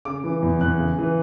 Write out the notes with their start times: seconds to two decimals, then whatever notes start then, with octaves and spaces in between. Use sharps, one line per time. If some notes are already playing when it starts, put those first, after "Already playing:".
0.05 C#3 D6
0.24 E3
0.43 E2
0.61 E2 F#6
0.79 C#3
0.99 E3